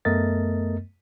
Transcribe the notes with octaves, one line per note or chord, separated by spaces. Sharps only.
F#2 A3 B3 A#4 D#5 A6